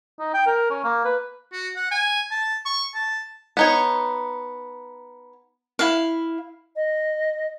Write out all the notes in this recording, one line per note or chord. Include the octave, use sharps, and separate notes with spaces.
D#4
G5
A#4
C#4
A#3
B4
F#4
F#5
G#5
A5
C#6
A5
B3 D#4 C#5
E4 F5
D#5